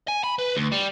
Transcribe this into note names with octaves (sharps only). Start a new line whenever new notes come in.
G#5
B5
B4
D2
G3